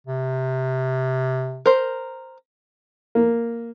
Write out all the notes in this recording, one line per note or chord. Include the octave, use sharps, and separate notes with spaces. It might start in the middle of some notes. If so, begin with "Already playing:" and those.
C3
A#4 C5
A#3